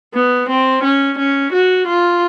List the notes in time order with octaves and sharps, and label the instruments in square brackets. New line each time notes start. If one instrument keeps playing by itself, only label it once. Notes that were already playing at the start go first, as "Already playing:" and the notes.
[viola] B3
C4
C#4
C#4
F#4
F4